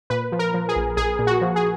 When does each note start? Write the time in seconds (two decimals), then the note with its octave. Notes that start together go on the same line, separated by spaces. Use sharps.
0.10 A#2 B4
0.32 F3
0.39 A#4
0.54 F3
0.69 G#4
0.76 A#1
0.97 A#1 G#4
1.19 A#2
1.27 F#4
1.41 F3
1.56 G#4